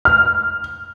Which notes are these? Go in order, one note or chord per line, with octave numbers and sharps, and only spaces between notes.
F6